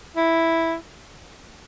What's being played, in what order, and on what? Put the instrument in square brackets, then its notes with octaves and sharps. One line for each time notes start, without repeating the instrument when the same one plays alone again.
[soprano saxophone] E4